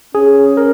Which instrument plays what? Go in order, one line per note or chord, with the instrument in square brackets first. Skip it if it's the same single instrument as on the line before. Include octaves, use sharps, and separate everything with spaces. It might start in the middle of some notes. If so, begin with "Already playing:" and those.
[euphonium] C#4 [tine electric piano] G#4
[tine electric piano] A#4